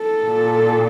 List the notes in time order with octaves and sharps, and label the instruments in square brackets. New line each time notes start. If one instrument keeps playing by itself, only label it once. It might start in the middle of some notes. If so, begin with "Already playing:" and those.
Already playing: [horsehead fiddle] A4
[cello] A#2